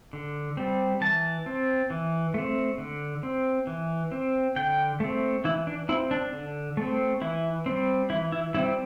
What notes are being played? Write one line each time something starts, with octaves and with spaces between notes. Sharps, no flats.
D3
G3 C4
E3 A5
C4
E3
A3 C4
D3
C4
E3
C4
D3 G5
A3 C4
E3 E4
D4
C4 E4
D4
D3
A3 C4
E3 E4
G3 C4
E3 E4
E4
G3 C4 E4